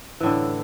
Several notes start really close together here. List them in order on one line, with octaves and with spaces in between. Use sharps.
E3 A2 D3